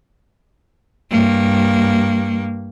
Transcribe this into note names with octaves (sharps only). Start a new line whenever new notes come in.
G2 A#3